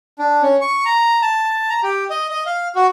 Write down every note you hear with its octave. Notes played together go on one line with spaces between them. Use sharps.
D4
C#4
C#6
A#5
A5
A#5
G4
D#5
D#5
F5
F#4